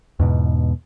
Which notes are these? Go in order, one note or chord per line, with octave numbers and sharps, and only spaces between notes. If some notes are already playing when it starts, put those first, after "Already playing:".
E2 G#2 B2